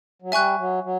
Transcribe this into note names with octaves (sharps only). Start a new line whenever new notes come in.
F#3
G3 E5 G#5 C#6 F#6
F#3
F#3